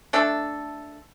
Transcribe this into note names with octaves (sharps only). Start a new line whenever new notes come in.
A3 D4 A4